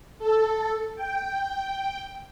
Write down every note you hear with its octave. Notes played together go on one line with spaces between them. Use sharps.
A4
G5